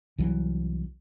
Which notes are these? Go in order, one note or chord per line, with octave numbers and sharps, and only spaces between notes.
C2 E3 F#3